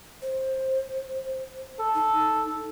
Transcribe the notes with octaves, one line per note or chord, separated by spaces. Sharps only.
C5
A4
D#4